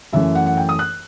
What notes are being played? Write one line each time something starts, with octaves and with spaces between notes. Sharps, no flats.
F#2 E3 A3 E5
F#5
F#5
G5
D#6
F#6